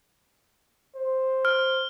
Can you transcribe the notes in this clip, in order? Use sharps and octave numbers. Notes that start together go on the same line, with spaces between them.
C5
F6